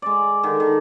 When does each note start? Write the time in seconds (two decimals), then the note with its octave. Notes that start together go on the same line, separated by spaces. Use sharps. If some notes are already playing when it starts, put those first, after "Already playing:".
0.02 G#3 D5
0.43 D3 D#3
0.60 D#3